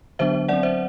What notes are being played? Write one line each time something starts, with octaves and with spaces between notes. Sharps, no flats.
D3 F#3 B3 D4 C5 E5
F#3 C4 D5 F#5
C5 E5